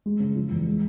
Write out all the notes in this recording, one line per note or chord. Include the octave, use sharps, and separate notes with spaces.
G#3
C#3
F3
E2
G#3